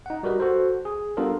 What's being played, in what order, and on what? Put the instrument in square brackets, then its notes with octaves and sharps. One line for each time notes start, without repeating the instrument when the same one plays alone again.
[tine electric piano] D#4 F#5
G3 F#4 A#4 B4 D#5
F#4 A4 C5
G#4
G3 B3 D4 F4 A4 A#4